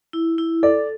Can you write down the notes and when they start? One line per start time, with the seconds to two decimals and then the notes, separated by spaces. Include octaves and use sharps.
0.13 E4
0.38 E4
0.63 A4 D5